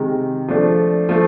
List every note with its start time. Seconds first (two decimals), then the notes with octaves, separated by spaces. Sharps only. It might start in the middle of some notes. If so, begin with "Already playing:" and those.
Already playing: C3 D#3 G#3
0.48 F3 A3 D4
1.09 F3 A3